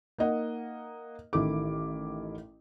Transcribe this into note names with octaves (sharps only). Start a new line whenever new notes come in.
A#3 D#4 D#5 F#5
A1 D#3 E4 A4 D6